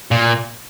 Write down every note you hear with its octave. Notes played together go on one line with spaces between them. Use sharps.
A#2